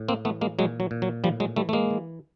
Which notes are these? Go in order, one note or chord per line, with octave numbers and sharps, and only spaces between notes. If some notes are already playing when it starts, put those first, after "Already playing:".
Already playing: A2
A#3 C4
E3 A3 B3
G#3 A#3
A#2 F#3 G#3
F#3
A#2
F#3
A2 F3 G3
F#3 G#3
E3 G3 A3
A3
G#3 A#3
E3